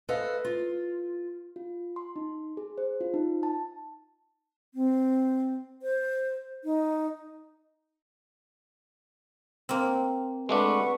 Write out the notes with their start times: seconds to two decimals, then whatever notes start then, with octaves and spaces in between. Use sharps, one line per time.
0.08 A4 B4 C5 D#5 F5
0.45 F4
1.56 F4
1.96 C6
2.16 D#4
2.57 G#4
2.78 C5
3.01 F4
3.14 D#4
3.43 A5
4.74 C4
5.82 C5
6.64 D#4
9.69 A#3 C4
10.49 G#3 A3 D4 B4 F#5 C#6